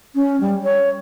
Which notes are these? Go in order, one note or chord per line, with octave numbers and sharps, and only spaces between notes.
C#4
G3
C#5